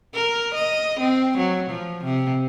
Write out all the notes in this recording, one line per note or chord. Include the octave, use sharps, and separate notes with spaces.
A#4
D#5
C4
F#3
F3
C3